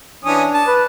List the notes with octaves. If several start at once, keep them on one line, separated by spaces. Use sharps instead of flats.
E3 C#4 D4 D#6
A5
B4